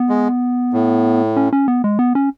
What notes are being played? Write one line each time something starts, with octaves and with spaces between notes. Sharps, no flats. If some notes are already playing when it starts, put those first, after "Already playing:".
Already playing: B3
G#3
A2
C#4
C#4
B3
G#3
B3
C#4